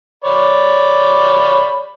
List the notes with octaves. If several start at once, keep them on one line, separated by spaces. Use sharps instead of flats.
C#5 D5 B5